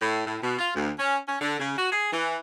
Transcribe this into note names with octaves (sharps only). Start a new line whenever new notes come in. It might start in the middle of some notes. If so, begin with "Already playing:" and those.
A2
A2
B2
F4
D2
C#4
C#4
D3
C#3
F#4
G#4
E3